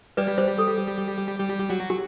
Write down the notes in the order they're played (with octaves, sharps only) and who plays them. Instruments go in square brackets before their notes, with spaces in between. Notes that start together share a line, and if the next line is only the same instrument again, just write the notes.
[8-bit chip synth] G3 G4 [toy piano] B4 D5
[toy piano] C5
A4
[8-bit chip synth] G3 G4
F#3 F#4
[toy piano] G4